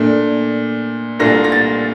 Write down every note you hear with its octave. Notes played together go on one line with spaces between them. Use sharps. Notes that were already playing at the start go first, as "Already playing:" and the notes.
Already playing: A#2 A3 D4
C2 A#2 A3 D4 F4 A#6
A#6
A6